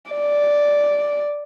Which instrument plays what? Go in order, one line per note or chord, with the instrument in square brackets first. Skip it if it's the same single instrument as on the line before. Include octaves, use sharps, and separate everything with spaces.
[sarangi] D5